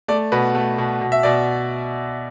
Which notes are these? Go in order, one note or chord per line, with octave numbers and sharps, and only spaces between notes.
A3 D5
B2 B4
A3
B2
B2
E5
B2 D5